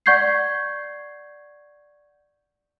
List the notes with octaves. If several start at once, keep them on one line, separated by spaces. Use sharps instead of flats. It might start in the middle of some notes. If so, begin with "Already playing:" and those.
D5 F#5 C#6 G6 G#6 C7